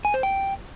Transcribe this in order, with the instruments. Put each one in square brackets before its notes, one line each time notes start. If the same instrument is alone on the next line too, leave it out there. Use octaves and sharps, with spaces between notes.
[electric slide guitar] G#5
C5
G5